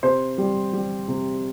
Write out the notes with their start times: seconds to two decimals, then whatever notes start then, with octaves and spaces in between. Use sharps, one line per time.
0.03 C3 C5
0.38 G3
0.73 G3
1.08 C3